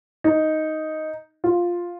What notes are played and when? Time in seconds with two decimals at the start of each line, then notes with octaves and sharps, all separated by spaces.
0.24 D#4
1.44 F4